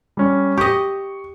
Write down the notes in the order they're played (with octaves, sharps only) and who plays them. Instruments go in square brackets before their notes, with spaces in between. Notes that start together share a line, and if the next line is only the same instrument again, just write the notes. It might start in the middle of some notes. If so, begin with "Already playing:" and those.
[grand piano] G3 C#4
[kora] G4 D#5 [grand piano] C#6